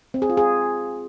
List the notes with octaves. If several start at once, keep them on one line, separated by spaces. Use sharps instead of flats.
C4
G#4
F4
G#4